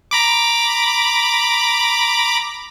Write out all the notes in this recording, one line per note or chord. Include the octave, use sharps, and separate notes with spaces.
A#5 B5 D6